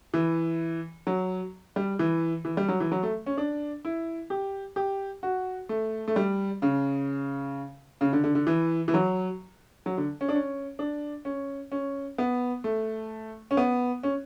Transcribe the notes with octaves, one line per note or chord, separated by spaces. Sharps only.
E3
F#3
G3
E3
E3
G3
F#3
E3
F#3
A3
C#4
D4
E4
G4
G4
F#4
A3
A3
G3
C#3
C#3
D3
D3
D3
E3
E3
F#3
F#3
D3
C#4
D4
C#4
D4
C#4
C#4
B3
A3
C#4
B3
C#4